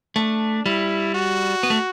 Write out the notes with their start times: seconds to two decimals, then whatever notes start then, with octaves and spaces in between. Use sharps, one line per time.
0.16 A3 D4
0.65 G3 E4
1.14 F#4
1.63 B3
1.70 A3